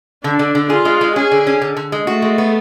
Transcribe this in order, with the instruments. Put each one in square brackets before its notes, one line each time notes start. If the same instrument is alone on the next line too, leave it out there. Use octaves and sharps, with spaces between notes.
[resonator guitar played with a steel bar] D3 [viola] D4
[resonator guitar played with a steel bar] D3
D3
[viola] F4 [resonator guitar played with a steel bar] G#4
[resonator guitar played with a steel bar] G#3
G#3
[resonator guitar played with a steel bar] C#4 [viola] G#4
[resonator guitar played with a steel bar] D3
C#4
D3
D3
G#3
[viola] A3 [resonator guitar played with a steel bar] F#4
[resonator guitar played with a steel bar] G#3
B3